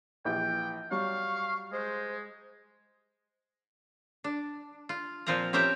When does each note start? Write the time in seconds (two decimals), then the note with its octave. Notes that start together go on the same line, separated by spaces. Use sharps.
0.25 A#1 E3 G4 G5
0.91 F#3 G3 F5 C#6
1.72 G#3 C5
4.24 D4
4.89 F4
5.26 A#2 F3 C4 F4 A#4 A#5
5.53 C4 C#4 G4 A#4 E5 G5